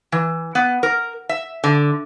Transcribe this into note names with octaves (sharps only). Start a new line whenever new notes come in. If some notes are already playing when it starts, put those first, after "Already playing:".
E3
B3
A#4
E5
D3